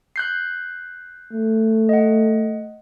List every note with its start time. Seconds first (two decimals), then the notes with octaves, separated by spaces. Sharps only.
0.16 F#6 G6 C7
1.32 A3
1.89 D#5 F#5